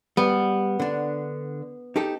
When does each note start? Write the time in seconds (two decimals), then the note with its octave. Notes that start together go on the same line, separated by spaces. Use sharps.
0.17 G3 B3
0.80 D3 D4
1.96 D#4 G4 A4